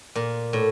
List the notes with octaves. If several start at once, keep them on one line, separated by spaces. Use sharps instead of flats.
A#2
A2